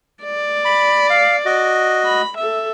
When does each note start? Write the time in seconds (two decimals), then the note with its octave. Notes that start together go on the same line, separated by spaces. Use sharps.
0.23 D5
0.65 B5
1.10 F5
1.45 F#4 D#5
2.05 B5
2.38 A4 E5